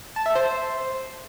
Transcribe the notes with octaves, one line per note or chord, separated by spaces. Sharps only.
A5
E5
C5